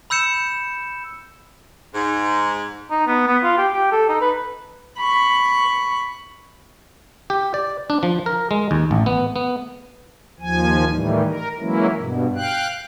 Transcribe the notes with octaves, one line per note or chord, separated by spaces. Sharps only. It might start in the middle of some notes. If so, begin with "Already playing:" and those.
B5 E6 G6 C#7 E7
G#2
D#4
B3
B3
F4
G4
G4
A4
D#4
B4
B5 C#6
G4
D5
D4
F3
A#4
G#3
D#2
A1
B3
B3
D#2 F3 G#5
A2 D#3 E3 G3
A#4
E3 F#3 G#3 A#3 C#4 E4
G2 B2
F5 G5 F#6